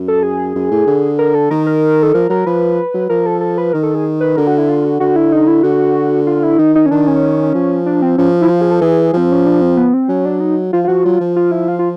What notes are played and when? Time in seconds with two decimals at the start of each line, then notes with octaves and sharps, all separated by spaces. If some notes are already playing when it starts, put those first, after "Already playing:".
Already playing: F#2
0.08 A4
0.23 G#4
0.55 F#2
0.71 A2
0.87 D3
1.19 A#4
1.35 A4
1.50 D#3 A#4
1.66 A#4
2.03 A4
2.14 F3 A#4
2.29 F#3 A#4
2.46 F3 B4
2.94 F#3
3.09 F3 A#4
3.26 A4
3.41 A4
3.58 B4
3.73 D#3 A#4
3.83 A4
3.95 G#4
4.21 B4
4.37 D3 A#4
4.47 F#4
4.58 E4
4.69 F4
4.85 F#4
5.00 D3 F#4
5.16 E4
5.32 D#4
5.47 E4
5.63 D3 F#4
6.27 F4
6.43 E4
6.59 D#3 D#4
6.75 D#4
6.86 C#4
6.91 D#3 D4
7.07 C#4
7.54 F3
7.86 D4
8.02 C4
8.18 F3 C#4
8.42 E4
8.50 F4
8.61 G#4
8.71 A4
8.81 E3 G#4
9.13 F3 C4
9.32 C#4
9.46 D4
9.61 C4
9.77 B3
9.94 C4
10.09 F#3 C#4
10.25 D4
10.40 D#4
10.73 F3 F4
10.84 F4
10.88 F3 F#4
11.04 F#3 F4
11.20 F3
11.36 F4
11.51 E4
11.68 F4
11.79 F4